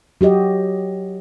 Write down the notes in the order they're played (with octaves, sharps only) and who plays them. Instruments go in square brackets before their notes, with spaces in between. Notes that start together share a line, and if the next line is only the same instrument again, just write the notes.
[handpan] F#3 F#4 G4 D#5